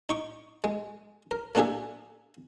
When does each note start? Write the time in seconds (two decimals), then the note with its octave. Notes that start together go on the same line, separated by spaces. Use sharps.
0.09 D#4 C#6 D6
0.64 G#3
1.31 A#4
1.55 A3 A#3 D4 G4 G#4 E5